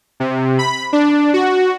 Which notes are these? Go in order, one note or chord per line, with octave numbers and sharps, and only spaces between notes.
C3
B5
D4
F#4